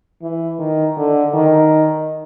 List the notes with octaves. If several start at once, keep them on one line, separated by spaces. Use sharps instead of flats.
E3
D#3
D3
D#3